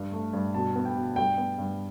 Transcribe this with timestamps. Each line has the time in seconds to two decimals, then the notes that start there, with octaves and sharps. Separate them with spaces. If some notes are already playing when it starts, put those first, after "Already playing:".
Already playing: G2
0.12 A3
0.33 G2
0.54 B2 A5
0.75 B3
0.85 G5
0.95 B2
1.16 G2 G5
1.38 B3
1.58 G2